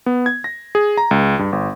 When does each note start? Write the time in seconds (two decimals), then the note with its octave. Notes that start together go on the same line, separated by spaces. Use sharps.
0.06 B3
0.26 G#6
0.44 A#6
0.75 G#4
0.97 A#5
1.11 C#2
1.39 G2
1.52 G1